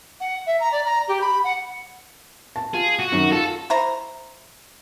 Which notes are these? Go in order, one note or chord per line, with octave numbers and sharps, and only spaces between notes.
F#5
E5
A#5
D5
A#5
G4
B5
F#5
A5
F4 G#4
F#4
F#2 D#3
F4 A4
E4 C5 A#5